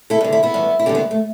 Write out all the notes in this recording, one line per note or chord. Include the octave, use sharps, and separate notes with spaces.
E4 A4
G2 D3
E4 A4
B3 E4
G2 E3
E4
G2 D3 D4 G4
B3 E4
A3